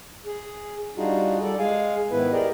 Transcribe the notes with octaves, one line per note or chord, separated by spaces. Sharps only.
G#4
G3 D4 D#4 F4 F#4 G#4
G3 A4 D5
G#3 G#4 F5 G#5
G#2 D#3 B3 E4 B4
G4 G#4 A#4 D5 D#5